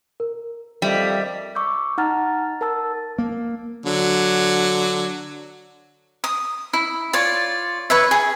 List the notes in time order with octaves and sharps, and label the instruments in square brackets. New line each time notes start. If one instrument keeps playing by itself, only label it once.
[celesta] A#4
[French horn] F2 [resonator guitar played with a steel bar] G3 [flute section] D#5 E5
[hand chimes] C#6 D6 E6 G6
D#4 F#5 A#5 F6 A6
A#4 A5 E6 A6
[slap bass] A#3
[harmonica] D3 F#3
[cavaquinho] D#6
E4
F4 C#5 D5
B4 C#5 E5
G#4